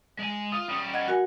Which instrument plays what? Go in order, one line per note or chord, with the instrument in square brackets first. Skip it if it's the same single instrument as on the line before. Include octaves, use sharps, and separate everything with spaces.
[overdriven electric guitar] G#3 G#5
[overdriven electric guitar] F4 [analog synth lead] D#6
[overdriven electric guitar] G3 C#4
[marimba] D#5 G#6 [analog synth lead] F#5
[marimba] F#4 A#4 G#5